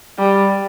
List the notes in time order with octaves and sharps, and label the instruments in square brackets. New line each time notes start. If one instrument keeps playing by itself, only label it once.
[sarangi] G3